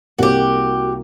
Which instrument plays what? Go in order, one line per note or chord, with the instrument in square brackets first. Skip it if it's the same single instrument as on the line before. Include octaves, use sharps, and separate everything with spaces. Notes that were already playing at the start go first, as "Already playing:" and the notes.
[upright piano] C2 A#3 [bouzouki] F#4 G4